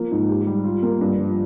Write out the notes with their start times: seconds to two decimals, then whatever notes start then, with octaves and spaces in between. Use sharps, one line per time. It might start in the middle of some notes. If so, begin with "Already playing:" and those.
Already playing: F3 A#3
0.11 G#2
0.28 G4
0.47 G3
0.65 F4
0.82 A#3
1.01 G2
1.18 F3